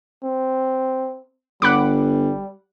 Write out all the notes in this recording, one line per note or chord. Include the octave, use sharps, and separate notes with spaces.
C4
G1 G3 F#5 B5 D6